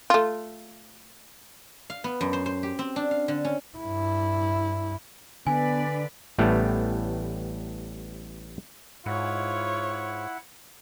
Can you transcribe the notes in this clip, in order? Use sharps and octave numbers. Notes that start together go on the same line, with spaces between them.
A3 F4
F5
B3
F#2
C5
C5
G4
C4
D4
F5
D3
C#4
G2 E4
D3 B3 D4 B4 D5 G#5
A1 A2 G3 A3 B3
G#2 E4 F4 C#5 F#5